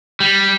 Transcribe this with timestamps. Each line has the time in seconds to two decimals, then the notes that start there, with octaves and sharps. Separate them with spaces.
0.20 G3